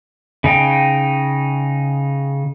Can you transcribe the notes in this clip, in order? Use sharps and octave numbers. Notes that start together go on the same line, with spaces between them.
C#3 D#4 G5